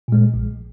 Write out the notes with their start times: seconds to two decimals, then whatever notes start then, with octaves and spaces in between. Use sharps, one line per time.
0.08 A#2 G#3
0.34 A#1